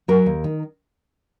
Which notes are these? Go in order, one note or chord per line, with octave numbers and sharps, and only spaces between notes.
F#3 A#4
D#2
D#3